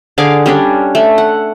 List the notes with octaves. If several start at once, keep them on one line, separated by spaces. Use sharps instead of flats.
D3 G#4 F5 D6
G3 C#4 D4
A3
F#5